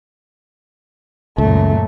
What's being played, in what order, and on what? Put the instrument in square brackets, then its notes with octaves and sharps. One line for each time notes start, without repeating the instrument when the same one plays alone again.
[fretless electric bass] C#2 [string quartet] F#2 A#2 A3